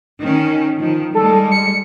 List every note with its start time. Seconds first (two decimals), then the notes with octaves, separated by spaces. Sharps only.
0.20 D#3 C#4
0.78 D#3 F3
1.15 G3 G#3 A4
1.51 C#7